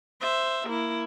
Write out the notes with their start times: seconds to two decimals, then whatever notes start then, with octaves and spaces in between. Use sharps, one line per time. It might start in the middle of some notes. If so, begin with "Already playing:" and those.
0.21 C5 E5
0.68 A#3 E4